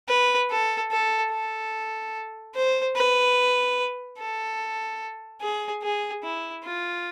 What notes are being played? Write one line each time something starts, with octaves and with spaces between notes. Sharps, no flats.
B4
A4
A4
A4
C5
B4
A4
G#4
G#4
E4
F4